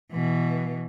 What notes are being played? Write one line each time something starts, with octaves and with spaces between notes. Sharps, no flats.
B2 E3